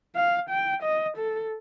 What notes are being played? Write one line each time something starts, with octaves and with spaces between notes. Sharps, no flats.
F5
G5
D#5
A4